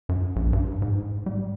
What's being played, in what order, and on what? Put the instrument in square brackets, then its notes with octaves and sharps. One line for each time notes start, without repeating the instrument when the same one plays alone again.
[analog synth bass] F#2
A#1
G2
G#2
G3